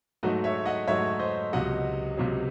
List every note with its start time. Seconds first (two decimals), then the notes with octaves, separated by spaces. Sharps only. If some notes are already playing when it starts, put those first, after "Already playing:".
0.23 G#2 F#3 A3 D#4 F#4
0.44 C#5 E5
0.65 D#5 F#5
0.87 G#2 F#3 A3 C#5 E5
1.19 C5 D#5
1.53 C#2 C3 F#3 D#5 F#5
2.17 C#2 C3 F#3